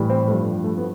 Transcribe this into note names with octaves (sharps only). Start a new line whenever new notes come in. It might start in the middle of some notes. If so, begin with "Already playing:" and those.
Already playing: A2 E3 G3
C4
G2 F3 A3
A3
B3